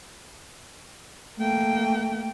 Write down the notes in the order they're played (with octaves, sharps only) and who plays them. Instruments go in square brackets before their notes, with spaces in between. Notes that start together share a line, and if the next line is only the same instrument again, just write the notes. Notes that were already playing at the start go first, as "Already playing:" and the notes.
[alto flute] A3 [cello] A#3 G5